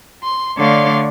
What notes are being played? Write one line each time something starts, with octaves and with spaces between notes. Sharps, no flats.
C6
D3 A3 C#5 D5 F5 C6